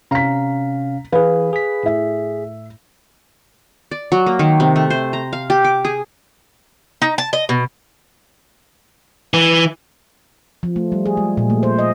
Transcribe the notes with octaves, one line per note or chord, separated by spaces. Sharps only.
C3 C#4 F5 A#5 B6
E3 G#4 B4 F5
G#4 B6
A2 E5
D5
F#3
A#3
D#3
C3
A3
C5
A#5
F5
G4
D6
G#4
D#4
A5
D#5
B2
E3
F3
A3
G3
G#4
G#3
A#2
A3
C5
D#5